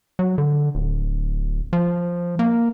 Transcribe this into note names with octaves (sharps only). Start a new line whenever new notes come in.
F#3
D3
D1
F3
A#3